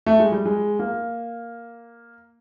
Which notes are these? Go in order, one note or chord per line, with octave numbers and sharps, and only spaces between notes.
A3
G#3
G3
G#3
A#3